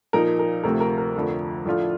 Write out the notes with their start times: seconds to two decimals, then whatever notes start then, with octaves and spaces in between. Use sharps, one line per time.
0.13 A#2 F3 A#3 D#4 A#4
0.39 A#4
0.63 D2 C3 F3 A3 A#4
0.80 A#4
0.98 A#4
1.15 F2 D3 F3 A3
1.66 A2 F3 A3 D4 F4